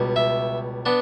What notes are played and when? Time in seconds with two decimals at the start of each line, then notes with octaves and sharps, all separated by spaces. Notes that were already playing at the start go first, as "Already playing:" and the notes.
Already playing: C#2 B2 G3
0.16 E5
0.86 B3 D4